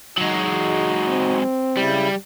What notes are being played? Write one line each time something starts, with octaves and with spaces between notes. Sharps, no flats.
F#3 G#3 D#4 F#4
C4
C#3 G3 E4